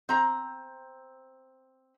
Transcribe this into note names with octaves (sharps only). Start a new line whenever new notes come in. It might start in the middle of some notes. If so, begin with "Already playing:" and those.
C4 A#5